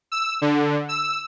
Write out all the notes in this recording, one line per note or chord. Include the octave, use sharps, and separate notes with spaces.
E6
D3
E6